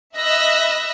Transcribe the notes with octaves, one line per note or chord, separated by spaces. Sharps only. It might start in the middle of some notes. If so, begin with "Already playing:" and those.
D#5 E5 B5 E6 F#6 A#6